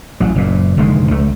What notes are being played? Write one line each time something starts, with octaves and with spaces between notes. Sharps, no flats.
A1 F#3
F#1 A#2
F1 D3 D#3 G#3
C#2 A3